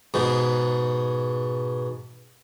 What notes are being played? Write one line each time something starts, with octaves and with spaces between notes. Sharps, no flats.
G#2 B2